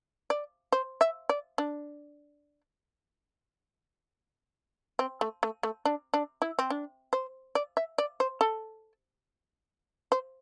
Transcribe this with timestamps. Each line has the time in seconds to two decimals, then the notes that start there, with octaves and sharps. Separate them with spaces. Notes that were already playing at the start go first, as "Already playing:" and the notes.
0.30 D5
0.72 C5
1.01 E5
1.29 D5
1.58 D4
4.99 C4
5.21 A3
5.43 A3
5.63 A3
5.85 D4
6.14 D4
6.42 E4
6.59 C4
6.70 D4
7.13 C5
7.55 D5
7.77 E5
7.98 D5
8.20 C5
8.41 A4
10.12 C5